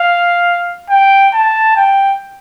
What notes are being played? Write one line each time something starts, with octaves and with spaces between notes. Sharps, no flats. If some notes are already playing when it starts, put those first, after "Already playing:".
Already playing: F5
G5
A5
G5